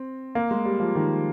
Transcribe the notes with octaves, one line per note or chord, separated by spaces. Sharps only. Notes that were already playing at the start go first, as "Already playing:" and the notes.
Already playing: C4
A#3
G#3
G3
F3
D#3